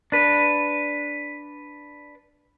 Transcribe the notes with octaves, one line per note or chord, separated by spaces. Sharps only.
D4 B4